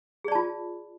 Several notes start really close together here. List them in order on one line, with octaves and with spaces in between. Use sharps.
G#4 D5 A5 F4